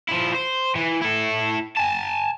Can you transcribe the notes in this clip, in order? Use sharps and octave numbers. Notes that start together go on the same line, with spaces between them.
F3 E4
C5
E3
E4 A4
G#5 A5